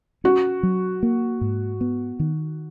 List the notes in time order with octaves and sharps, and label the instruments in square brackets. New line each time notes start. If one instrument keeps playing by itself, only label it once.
[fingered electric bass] C#4 [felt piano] F#4
[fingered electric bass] F#3
A#3
G#2
B3
D#3